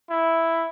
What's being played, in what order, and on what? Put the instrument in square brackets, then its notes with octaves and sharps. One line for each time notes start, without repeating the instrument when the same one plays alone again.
[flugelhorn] E4